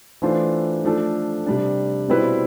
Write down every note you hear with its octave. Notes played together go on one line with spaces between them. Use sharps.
E3 A3 D4 F4 C5
F3 A3 D4 A4
C3 G3 D4
B2 G3 C4 E4 B4